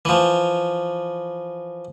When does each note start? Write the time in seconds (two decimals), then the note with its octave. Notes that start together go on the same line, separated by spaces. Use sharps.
0.05 E3 F3